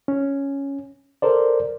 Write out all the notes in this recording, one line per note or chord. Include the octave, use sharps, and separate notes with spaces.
C#4
A4 A#4 C5 D5